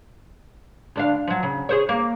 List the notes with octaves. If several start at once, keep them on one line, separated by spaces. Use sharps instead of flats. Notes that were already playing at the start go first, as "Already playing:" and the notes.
D2 D4 F5
F3 F#3
C#3
G#4 C5 C#5
A#3